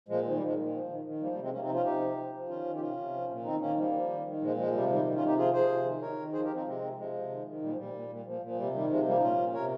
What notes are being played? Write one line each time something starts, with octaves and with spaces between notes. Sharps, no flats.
A#2 F3 G#3
D#3 F3
G3
D#3
F3 G#3
A#2
F3
D#3
D#3
F3 G3 A#3
G3 A#3
C3
G#3 C4
C3 A#3 C#4
C4 D#4
F3
C#4 F4
C3 D#4 G4
F3
F3
F3
D#3 C#4 F4
D#3
G4
C3 C#4 F4
C3
F3
A#2
D#3 C4 D#4
D#3 A#3 C#4
F3 G3 A#3
F3
D#3
D#3
A#2 F3 G#3
F3 G#3
C3 G3
G#3
D#3 G3
D#3 G3
C#4 F4
C3 D#4 G4
F3 F4 G#4
F3 G#4 C5
C3
D#3
D#3 A#4 C#5
D#3
F3 G#4 C5
G4 A#4
F3
C4 D#4
C3 G#3 C4
C3
C3 F3 G#3
C3
D#3
D#3
A#2 G3
F3
A#2 G3
A#2
A#2
A#2 F3
A#2 F3
C3 G3
D#3 G3
C3 F3 G#3
F3 G3 A#3
D#4
A#2 C#4 F4
A#2
C3 A#4 C#5